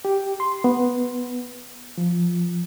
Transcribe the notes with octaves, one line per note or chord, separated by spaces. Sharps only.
G4
C6
B3
F3